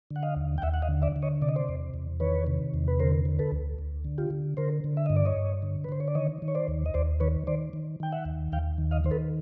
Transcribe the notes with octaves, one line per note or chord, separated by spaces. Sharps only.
D3
F#5
D#5 F5
D#2
G5
D#2 E5 F#5
F#5
D#5 F5
D3
D5 E5
D3
C#5 D#5
C3 D5
D#5
C5 D5
E2
E2
D#3 B4 C#5
C3
E2
B4
D3 A#4 C5
D3
A4 B4
D2
D2
D3
F4 G4
D3
D3 A#4 C5
D3
E5
G2 D#5
D5
C#5 D#5
G2
D3
B4
D3 C5
C#5
D5
D#3 C#5 D#5
D#3
C#5
C5 D5
D#2
D#5
D#2 C5 D5
D#3 B4 C#5
D#3 C5 D5
D#3
D#3 G5
E5 F#5
D#2
D#2 F5 G5
D#3
D#5 F5
D#3 C5
A4 B4